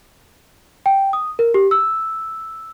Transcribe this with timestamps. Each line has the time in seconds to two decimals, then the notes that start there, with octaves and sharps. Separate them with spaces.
0.86 G5
1.13 D#6
1.39 A#4
1.54 G4
1.71 E6